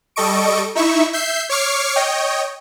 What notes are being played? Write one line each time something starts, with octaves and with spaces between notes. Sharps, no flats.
G3 A4 D#5 C#6 D7
D#4 E4 E5 C#6
E5 G6 C7
C#5 C#6 D6 F6 C7
C#5 D#5 G5